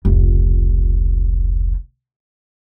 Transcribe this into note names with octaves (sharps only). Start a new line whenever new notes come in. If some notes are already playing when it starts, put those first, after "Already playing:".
F1 C#2